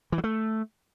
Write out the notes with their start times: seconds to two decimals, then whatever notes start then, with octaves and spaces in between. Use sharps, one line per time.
0.12 E3
0.18 F#3
0.24 A3